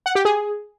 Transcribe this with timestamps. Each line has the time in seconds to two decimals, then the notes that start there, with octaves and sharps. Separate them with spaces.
0.06 F#5
0.15 G4
0.25 G#4